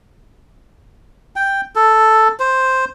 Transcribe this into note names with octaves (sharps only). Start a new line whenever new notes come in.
G5
A4
C5